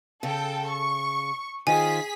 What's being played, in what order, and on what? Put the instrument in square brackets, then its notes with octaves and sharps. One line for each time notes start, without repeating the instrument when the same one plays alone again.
[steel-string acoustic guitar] C#3 [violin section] A4 G5
[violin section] C#6
[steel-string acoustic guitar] D#3 F4 C5 [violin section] G#4 B6 [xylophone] G#5